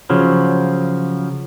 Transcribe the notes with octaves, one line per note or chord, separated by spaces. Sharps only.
C#3 F3 F#3